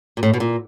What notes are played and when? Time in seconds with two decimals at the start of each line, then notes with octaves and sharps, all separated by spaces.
0.17 A#2
0.23 A2
0.34 B2
0.40 A#2